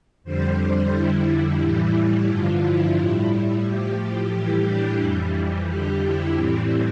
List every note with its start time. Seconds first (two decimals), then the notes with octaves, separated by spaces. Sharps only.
0.24 F2 D3 G3 C5
0.58 C5
0.92 F2 D3 G3 E4
1.60 A2 E3 G3
2.27 G2 D3 F3 F4
2.62 E4
2.95 A2 G3
3.64 A2 F3 G4
3.97 G4
4.31 A2 E3 G3 G4
4.65 D4
4.99 F2 E3 G3
5.67 F2 D3 G3 G4
6.01 E4
6.34 A2 E3 G3 C4